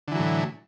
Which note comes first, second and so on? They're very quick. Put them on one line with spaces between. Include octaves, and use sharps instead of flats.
D3 E3 F#3 A2